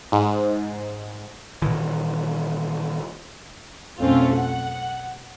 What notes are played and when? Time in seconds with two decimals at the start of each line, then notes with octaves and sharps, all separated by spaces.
0.12 G#2
1.62 A#2 D#3 E3
3.99 B1 F2 A3 C4 C#4 F4
4.35 F#5